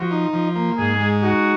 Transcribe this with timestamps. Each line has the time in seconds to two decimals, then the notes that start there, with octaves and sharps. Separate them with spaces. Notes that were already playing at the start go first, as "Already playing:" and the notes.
Already playing: F3 F#4
0.11 D#4
0.33 F3
0.56 A#3
0.78 G#2 G#4
1.00 G#3
1.23 D#4 F#4